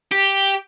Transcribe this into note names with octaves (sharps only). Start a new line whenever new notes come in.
G4